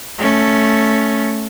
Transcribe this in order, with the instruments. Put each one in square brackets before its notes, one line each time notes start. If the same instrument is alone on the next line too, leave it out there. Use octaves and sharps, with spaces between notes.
[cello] A3 C#4